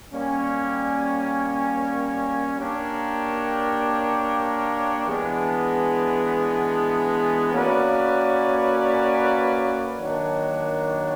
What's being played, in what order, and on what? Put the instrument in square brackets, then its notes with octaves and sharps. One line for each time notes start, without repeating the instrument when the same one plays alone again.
[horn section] G3 A#3 C#4
A#3 D4 G4 A#4 C#5
E3 G#3 B3 D4
A#3 C#4 F#4 B4 D5
D#3 F#3 A#3 D4